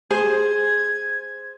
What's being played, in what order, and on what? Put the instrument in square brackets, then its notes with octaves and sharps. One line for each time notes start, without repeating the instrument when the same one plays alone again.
[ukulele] G#4 [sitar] C5 [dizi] G#6